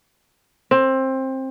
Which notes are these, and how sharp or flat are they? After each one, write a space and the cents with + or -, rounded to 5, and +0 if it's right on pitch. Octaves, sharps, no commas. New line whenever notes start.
C4 +20